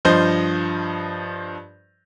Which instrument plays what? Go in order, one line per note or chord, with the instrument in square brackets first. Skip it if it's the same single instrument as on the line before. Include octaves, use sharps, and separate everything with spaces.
[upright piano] G2 F3 C5 D#5 G6